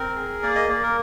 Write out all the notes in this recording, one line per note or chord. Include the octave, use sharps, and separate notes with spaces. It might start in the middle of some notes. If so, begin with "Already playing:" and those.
Already playing: C4 A#4
G#4
A#3 D5
D#5
A#3 D5
A#4